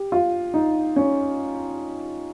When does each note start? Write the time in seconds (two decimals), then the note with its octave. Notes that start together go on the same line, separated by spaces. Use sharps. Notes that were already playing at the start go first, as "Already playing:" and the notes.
Already playing: G4
0.12 F4
0.54 D#4
0.96 C#4